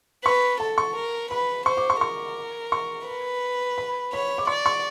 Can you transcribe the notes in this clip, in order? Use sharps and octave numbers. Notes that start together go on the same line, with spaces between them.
B4 C#6
A4 A5
C#6
A#4
B4 B5
C5 C#6
D6
C#6
A#4 C#6
C#6
B4
B5
C#5 B5
D6
D5 C#6
C#6